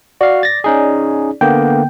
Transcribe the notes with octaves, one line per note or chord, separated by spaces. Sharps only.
F#4 D5 F5
A6 A#6
C#4 D#4 G#4
D3 A#3 B3 G5